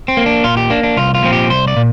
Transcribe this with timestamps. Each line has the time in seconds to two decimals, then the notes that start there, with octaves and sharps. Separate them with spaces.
0.08 C4
0.17 A#3
0.26 D4
0.44 A#2 F4
0.57 G4
0.70 A#3 D4
0.83 D4
0.97 C2 F4
1.15 F4
1.23 A#2 F3 C4
1.33 G4
1.50 C2 C5
1.68 D5
1.76 A#2